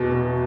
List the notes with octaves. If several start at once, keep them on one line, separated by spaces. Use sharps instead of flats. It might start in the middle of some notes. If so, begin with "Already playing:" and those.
Already playing: E2 B2
B2